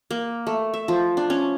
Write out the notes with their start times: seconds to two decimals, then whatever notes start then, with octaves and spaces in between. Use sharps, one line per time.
0.11 A#3
0.47 A3
0.74 E5
0.88 F3
1.17 D4
1.30 C#4